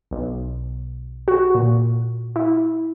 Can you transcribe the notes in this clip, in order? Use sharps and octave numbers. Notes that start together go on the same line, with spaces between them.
B1
F#4
A#2
E4